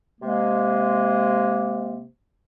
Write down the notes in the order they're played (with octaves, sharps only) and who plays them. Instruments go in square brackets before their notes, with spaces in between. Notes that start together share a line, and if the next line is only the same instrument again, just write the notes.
[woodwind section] C3 G#3 A#3